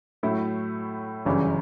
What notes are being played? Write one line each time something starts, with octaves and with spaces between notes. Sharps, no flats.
A2 F#3 A3 E4
G1 F#2 C#3 E3 G3